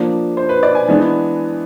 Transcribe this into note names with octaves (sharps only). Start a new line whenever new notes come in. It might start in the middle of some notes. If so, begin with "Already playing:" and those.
Already playing: F3 A#3 D4
C5
B4
D5
G#5
E3 G#3 B3 D4